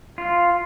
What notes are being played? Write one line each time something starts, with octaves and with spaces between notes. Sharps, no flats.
F4